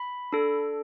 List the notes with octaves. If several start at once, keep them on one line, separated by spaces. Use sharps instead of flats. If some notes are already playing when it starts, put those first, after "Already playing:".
Already playing: B5
D4 A4